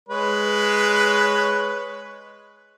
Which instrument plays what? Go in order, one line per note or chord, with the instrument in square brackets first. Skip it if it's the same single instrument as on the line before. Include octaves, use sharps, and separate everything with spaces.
[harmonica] G#3 B4 C#5